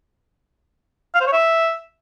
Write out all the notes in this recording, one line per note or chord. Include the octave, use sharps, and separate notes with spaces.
F5
C5
C#5
E5